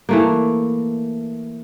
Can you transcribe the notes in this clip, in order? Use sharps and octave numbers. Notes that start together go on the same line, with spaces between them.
E3 A3 A#3